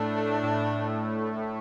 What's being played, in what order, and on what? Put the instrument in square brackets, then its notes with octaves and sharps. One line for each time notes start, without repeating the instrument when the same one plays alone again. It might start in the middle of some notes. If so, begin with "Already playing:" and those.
Already playing: [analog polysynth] A2 A3 [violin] D4
[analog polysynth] A3
A2